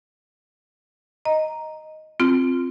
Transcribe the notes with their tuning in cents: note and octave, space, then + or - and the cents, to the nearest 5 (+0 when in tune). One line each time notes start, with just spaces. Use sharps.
D#5 +0 A#5 +0
C4 +0 F4 +0